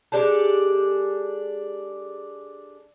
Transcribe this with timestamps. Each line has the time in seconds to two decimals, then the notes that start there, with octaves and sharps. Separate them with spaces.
0.12 G#3 D4 G4 A4